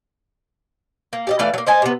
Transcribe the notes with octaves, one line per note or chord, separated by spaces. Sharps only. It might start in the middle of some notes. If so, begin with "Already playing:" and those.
A#3
G4 D5 D#5
E3 A3 D5 F5
F#3 A#3
C5 D#5 G#5 A5
C3 B3